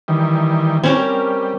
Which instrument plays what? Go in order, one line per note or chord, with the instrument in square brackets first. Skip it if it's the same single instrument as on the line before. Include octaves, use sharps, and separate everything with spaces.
[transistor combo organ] D#3 E3 G3
[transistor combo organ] G3 [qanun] C4 C#4 A#4